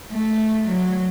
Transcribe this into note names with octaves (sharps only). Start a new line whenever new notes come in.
A3
F#3